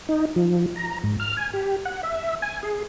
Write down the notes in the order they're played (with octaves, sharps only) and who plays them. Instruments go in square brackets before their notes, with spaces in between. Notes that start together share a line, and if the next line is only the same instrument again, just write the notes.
[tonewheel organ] D#4
F3
A#5
G#2
F6
G#5
G4
F#5
E5
G#5
G#4